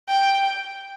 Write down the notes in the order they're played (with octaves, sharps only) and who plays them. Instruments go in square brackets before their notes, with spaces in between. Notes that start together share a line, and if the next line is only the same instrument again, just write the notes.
[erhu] G5